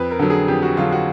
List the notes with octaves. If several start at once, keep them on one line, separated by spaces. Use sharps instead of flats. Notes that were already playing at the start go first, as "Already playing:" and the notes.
Already playing: F2 B4
A#4
D3 F#3
G#4
F2 G4
F#4
D3 F#3 F4
F#4